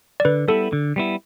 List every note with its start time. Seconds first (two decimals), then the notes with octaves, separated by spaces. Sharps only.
0.20 D5
0.25 D3 B4
0.48 G3 B3 E4 A4
0.73 D3
0.96 G3 B3 E4